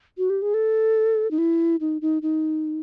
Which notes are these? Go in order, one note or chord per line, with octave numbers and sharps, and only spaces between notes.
F#4
G4
G#4
A4
D#4
E4
D#4
D#4
D#4